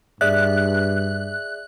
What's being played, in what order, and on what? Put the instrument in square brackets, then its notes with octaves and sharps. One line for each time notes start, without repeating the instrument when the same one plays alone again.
[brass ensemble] G2 [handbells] G#4 D5 E5 [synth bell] F#6